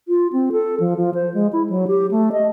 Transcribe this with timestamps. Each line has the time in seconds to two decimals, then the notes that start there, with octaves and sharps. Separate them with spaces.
0.08 F4
0.33 C4
0.52 A4
0.80 F3
0.97 F3
1.14 C5
1.34 G#3
1.53 E4
1.70 F#3
1.88 G4
2.11 A3
2.32 D#5